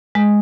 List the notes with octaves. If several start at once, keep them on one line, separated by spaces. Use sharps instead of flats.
G#3